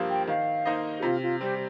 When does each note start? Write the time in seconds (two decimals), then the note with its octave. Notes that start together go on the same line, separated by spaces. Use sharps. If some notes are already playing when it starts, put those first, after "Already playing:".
Already playing: G2 F3 A#3 G4 C5
0.09 G5
0.27 D#3 F5
0.65 A#3 D#4 C5 D#5
0.99 G4
1.02 C3 F4
1.22 F4
1.41 G3 C4 G4